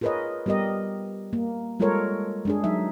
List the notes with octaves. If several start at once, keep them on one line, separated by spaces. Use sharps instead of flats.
F4 G#4 A#4 B4 C#5 D#5
G3 B3 G4 A#4 D#5
A#3
G3 G#3 F4 A4 A#4 C#5
G#3 D4 G#4
F#3 D#4 E5